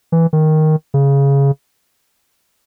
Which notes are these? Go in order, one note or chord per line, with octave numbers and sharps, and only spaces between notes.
E3
D#3
C#3